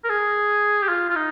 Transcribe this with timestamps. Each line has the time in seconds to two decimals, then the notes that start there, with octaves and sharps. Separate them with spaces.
0.05 A#4
0.09 G#4
0.82 G4
0.89 F4
1.10 F4
1.16 D#4